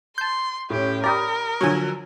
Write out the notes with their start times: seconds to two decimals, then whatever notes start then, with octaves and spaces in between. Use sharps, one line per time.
0.18 A5 C6 G6
0.70 A2 C#4 G4
1.04 G4 A#4 D5 A#5 B5 D#6
1.61 D3 F3 F#3 C#5 G#5